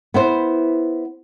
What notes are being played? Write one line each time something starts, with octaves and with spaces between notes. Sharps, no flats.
B3 E4 C5